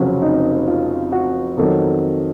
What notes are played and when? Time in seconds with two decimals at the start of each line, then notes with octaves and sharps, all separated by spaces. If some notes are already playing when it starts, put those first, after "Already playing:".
Already playing: F1 F2 C#3 F#3 C#4
0.22 D#4
0.68 F4
1.12 F#4
1.57 F2 D#3 F#3 A4